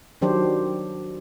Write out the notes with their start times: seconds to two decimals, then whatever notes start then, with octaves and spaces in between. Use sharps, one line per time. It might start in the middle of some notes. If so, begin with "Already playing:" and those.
0.22 D#3 F#3 D4 G4 C5